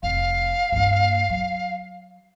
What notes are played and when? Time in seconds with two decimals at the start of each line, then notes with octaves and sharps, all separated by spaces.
0.03 F1 F5
0.72 G2 A#3
1.29 F#3